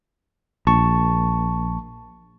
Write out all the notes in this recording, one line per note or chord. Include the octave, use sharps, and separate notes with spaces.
A#1 A5 C#6